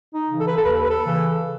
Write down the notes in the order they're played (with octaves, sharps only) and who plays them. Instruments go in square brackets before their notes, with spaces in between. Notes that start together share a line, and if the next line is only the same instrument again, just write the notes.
[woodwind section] D#4
C#3 E3
A4
B4
A4
D#2 B4
A4
B4
A4
C#3 E3